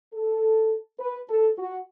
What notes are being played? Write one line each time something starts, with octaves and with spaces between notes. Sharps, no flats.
A4
B4
A4
F#4